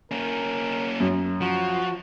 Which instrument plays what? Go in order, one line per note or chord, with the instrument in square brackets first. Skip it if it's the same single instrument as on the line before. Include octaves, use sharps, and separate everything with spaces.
[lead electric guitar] A#3 C#4 [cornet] A#4
[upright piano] F#2
[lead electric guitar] F3 [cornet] F#4